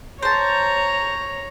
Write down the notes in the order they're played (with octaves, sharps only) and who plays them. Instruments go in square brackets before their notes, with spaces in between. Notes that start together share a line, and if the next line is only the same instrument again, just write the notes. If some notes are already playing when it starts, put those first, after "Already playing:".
[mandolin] C5 A5 [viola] C#5 A#5